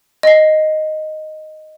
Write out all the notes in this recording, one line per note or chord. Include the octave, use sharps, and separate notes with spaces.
D#5 C7